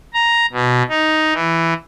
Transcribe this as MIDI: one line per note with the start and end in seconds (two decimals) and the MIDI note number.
0.14 0.46 82
0.53 0.83 47
0.89 1.33 63
1.34 1.74 52